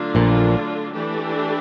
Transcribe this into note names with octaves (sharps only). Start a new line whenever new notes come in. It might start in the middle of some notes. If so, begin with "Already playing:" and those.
Already playing: D3 F#3 A3 D4 F4
A#1 A#2
E3 A3 D4 G4